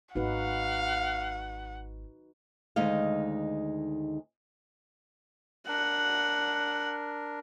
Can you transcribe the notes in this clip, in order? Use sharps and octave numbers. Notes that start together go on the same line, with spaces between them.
G#1 D#4 F#4 B4 F5 F#5
D2 D#3 G#3 D#4 D#5 F5
D4 A#4 F#5